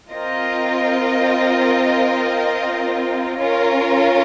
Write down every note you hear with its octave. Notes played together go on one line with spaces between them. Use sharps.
C4 F4 A#4 D#5
C#4 F4 A#4